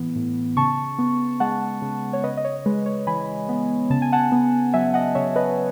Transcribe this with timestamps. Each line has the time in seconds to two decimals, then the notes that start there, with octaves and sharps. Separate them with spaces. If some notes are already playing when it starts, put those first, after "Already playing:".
Already playing: A2 E3 B3
0.16 A2
0.57 C#3 A5 C#6
0.99 B3
1.40 G#3 F#5 A5
1.82 C#3
2.13 C#5
2.23 C#3 B4 D#5
2.37 D#5
2.45 C#5
2.66 G#3 B4
2.86 C#5
3.07 E3 G#5 B5
3.49 B3
3.90 C#3 A5
4.02 G#5
4.13 F#5 A5
4.32 B3
4.74 F#3 E5 G#5
4.94 D#5 F#5
5.15 C#3 C#5 E5
5.36 B4 D#5